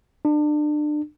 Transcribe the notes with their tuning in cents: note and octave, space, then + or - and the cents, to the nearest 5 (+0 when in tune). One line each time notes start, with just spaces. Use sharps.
D4 +30